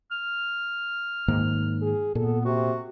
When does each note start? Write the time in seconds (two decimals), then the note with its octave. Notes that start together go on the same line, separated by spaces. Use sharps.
0.11 F6
1.28 G#2 D#3 A#3
1.82 G#4
2.15 A#2 B3 A4
2.45 C3 F#4